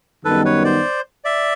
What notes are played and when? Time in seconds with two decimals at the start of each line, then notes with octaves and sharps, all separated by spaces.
0.25 F#2 D#3 G3 B3 D#4 A4 B4
0.45 B4 C#5
0.64 C5 D5
1.25 D5 E5